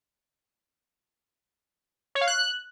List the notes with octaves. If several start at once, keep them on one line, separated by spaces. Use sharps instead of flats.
C#5
F5
F#6